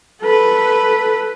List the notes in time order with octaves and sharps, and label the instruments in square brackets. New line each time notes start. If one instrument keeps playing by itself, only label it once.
[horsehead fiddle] A4 B4